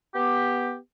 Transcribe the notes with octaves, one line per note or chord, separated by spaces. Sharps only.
B3 G4